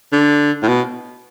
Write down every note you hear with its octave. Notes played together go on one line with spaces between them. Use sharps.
D3
A2
B2